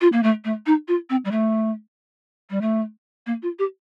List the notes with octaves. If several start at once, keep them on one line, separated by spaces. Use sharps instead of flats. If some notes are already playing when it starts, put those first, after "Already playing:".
F4
A#3
A3
A3
D#4
F4
C4
G3
A3
G3
A3
A#3
F4
G4